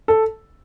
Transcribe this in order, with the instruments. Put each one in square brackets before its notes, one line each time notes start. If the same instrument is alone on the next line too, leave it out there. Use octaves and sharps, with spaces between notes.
[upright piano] A4